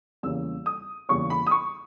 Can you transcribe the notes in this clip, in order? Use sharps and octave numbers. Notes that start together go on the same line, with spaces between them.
E2 C#3 G3 A#3 C#4 E6
D#6
E2 C#3 G3 A#3 C#4 C#6
B5
D#6
C#6